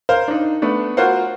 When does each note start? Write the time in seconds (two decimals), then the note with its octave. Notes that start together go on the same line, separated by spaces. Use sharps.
0.09 A#4 C5 F5
0.28 D4 D#4
0.62 A3 B3 D4
0.97 F4 F#4 A#4 C5 F5 F#5